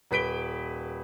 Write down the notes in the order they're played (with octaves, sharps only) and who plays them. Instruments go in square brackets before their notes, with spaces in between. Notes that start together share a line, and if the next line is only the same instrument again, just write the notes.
[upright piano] D#1 B4 B6 D7 G7